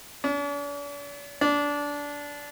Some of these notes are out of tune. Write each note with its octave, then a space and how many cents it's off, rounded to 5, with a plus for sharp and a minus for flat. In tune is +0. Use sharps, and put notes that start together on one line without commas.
D4 -45
D4 -20